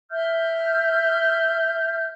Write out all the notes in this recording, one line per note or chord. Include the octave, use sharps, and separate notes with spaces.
E5 F6 G6